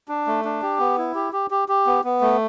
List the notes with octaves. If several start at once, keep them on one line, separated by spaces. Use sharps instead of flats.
D4
A3
D4
G4
B3
E4
G4
G4
G4
G4
B3
B3
A3